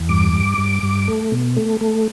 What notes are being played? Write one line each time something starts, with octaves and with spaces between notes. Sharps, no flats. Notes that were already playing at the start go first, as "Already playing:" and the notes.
Already playing: E2
G2 D6
G2
G2
G2
A3
B2
A3
A3